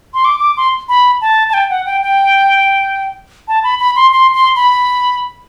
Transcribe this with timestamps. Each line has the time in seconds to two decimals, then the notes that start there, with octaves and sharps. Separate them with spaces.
0.14 C6
0.25 D6
0.40 D6
0.57 C6
0.89 B5
1.21 A5
1.49 A5
1.54 G5
1.70 F#5
1.86 G5
2.02 G5
3.48 A5
3.64 B5
3.80 B5
3.96 C6
4.12 C6
4.34 C6
4.56 B5